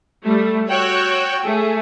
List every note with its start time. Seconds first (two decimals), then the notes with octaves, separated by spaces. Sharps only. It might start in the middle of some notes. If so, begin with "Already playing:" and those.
0.25 G3 A3
0.70 F#4 C#5 G5 E6 F#6
1.45 A3 G#4